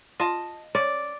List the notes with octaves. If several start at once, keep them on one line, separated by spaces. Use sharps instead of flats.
F4 D#5 A5
C#4 D5